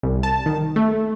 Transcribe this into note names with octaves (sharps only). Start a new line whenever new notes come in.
C2
A5
D#3
A3